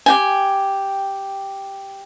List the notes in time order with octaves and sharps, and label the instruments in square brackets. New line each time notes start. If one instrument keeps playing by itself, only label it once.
[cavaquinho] G4 G5 G#5